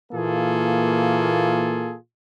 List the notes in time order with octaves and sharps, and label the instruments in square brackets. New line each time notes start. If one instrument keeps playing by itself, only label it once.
[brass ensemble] A#2 E3 A#3 F4 G#4 A4